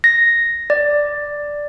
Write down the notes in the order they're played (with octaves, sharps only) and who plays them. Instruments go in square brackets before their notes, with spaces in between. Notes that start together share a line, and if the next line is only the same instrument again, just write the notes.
[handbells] A#6
D5